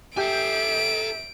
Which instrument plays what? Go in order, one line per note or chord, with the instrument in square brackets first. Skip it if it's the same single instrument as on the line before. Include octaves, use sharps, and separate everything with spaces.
[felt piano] G4 G6 [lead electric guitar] A4 G#5 [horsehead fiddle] E5 [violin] D7